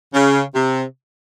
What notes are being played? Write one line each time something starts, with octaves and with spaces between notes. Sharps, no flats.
C#3
C3